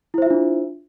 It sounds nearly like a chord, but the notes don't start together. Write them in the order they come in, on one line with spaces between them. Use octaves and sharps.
E4 C5 E5 F4 D4